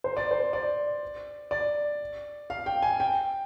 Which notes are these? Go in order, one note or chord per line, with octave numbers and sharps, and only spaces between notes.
C5
D5
C5
D5
D5
F5
G5
G#5
G5